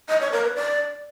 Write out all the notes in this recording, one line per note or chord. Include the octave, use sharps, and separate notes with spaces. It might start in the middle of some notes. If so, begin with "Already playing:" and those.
D#5
C#5
A#4
B4
D5